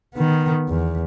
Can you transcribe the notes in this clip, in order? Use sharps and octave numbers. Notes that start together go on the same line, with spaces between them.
D#3 B3
E2